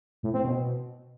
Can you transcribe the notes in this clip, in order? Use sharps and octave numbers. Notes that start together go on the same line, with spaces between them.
A2
C4
B2